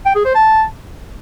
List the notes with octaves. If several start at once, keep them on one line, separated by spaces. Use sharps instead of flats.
G5
G#4
C5
A5